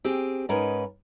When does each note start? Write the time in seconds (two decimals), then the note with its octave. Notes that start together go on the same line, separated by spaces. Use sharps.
0.04 C4 G4 G#4
0.49 G#2 C#4 D#4 A#4 B4